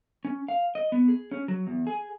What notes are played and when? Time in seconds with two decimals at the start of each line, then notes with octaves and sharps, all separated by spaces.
0.25 C#4
0.48 F5
0.75 D#5
0.92 B3
1.08 G#4
1.31 C#4
1.48 F#3
1.67 E2
1.87 G#4